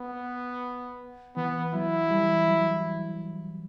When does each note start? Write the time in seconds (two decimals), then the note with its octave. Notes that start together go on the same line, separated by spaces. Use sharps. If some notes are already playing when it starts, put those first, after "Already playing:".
Already playing: B3
1.36 E3 B3
1.74 F#3 E4
2.10 E3 G3
2.48 F#3